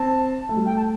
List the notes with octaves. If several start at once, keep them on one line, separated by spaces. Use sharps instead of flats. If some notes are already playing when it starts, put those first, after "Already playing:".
Already playing: C4 A5
A3
G3
A3 G5
A5